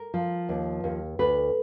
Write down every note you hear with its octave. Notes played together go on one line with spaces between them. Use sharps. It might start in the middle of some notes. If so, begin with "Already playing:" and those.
Already playing: A#4
F3
D#2
D#2
D2 B4